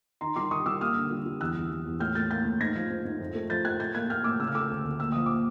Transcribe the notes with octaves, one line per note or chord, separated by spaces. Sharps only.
D#3 A#5 C6
G3 C6 D6
D#3 C#6 D#6
G3 D6 E6
A#3 D#6 F6
D3
G3
G3
E2 E6 F#6
E2
E2
E2
A2 F6 G6
A2 G6 A6
A#3 G6 A6
A2
G#2 G#6 A#6
F3
G#2
G#2
F2
A3
F3 G6 A6
A3 F#6 G#6
A2 G6 A6
A#3 F#6 G#6
A#3 F6 G6
A2 D6 E6
C#3 E6
F6
A3 D6 E6
D2
D2
A#2 E6
F3 D#6
A#2 D6